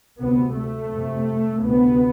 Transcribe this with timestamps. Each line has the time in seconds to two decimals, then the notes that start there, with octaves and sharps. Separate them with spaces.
0.20 D2 C3 B3
0.56 A3
0.91 F2 C3
1.63 D2 C3 B3